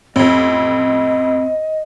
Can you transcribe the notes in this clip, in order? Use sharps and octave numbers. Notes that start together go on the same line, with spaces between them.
A1 F2 C4 D#5